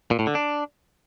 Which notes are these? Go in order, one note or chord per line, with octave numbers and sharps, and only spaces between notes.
A#2
A2
D3
D4